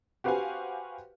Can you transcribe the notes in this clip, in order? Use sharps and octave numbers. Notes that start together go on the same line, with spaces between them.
F#4 G4 B4 C5 F5 G#5